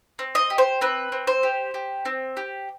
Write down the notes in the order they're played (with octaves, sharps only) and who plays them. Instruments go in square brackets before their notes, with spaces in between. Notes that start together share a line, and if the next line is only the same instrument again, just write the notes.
[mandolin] C4
D#5
G4
C5
C4 B4
C4
C5
G4
G4
C4
G4